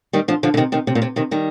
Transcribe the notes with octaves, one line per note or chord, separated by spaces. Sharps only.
D#3 G3
D3 F3
D3 F3
D3
C3 D#3
C3 D#3
C3
A#2
C3
C3 D#3
D#3 G3